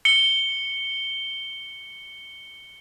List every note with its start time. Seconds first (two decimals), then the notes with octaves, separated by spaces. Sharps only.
0.05 C#7 G7